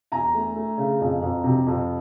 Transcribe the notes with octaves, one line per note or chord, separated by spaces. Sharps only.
E2 G#5 A#5
A3
A3
C#3
F2
F2
C3
F2